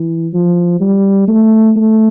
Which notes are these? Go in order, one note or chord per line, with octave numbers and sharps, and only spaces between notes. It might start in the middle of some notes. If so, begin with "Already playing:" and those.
Already playing: E3
F3
G3
A3
A3